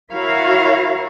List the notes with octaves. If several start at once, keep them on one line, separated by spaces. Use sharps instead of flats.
E4 F#4 A#4 C#5 E5 F5